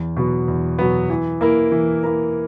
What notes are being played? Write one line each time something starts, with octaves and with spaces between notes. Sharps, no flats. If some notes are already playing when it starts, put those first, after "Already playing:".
Already playing: E2
B2 F#3 B3
E2
B2 F#3 B3
E3
A#3 E4 A#4
E3
A#3 E4 A#4